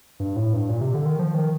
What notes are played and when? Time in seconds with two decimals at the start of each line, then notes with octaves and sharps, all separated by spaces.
0.20 G2
0.36 A2
0.53 G2
0.69 A#2
0.81 C3
0.94 D3
1.06 D#3
1.19 F3
1.34 D#3